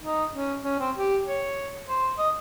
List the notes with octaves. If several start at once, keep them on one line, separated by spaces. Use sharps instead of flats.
D#4
C#4
C#4
C4
G4
C#5
C5
D#5